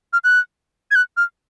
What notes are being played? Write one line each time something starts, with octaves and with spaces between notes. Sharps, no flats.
F6
F#6
G#6
F#6
F6